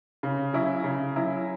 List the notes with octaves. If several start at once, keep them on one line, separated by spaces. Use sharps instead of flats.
C#3
F#3 C#4 E4
C#3
F#3 C#4 E4